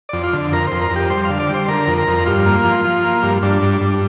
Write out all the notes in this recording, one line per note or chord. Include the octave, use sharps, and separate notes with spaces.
F2 D5
F4
D3
F2 A#4
F2 C5
A#4
F2 G4
G3 C5
D3 F5
D5
G3 C5
D3 A#4
F2
A#4
F2
G2 F4
A#3
F3
F3
A#3
G2
G2 D4
G2
G2